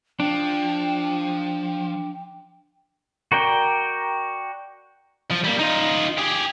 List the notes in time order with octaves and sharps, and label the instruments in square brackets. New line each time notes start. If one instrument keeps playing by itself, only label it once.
[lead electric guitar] F3 [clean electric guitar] D4 [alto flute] G5
[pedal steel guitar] F#4 A#4 D5 G5
[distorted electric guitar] F3
G3 A#3
D#4 F4
G4 G#4